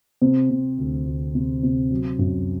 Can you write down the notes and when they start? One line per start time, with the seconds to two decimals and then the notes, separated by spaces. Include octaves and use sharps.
0.22 C3 C4
0.50 C3
0.78 D2
1.06 D2
1.35 C3
1.63 C3
1.91 F#3
2.19 F#2